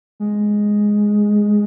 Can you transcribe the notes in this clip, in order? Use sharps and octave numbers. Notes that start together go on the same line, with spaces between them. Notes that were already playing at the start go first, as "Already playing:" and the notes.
G#3